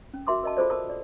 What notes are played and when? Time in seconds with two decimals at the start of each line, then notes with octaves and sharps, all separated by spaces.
0.14 C#4
0.27 F#4 A#4 E5 C6 D6 D#6
0.44 A#4 D#5 A5
0.57 F4 G#4 A4 C5 D5
0.70 A#4 A5 D#6
0.90 D5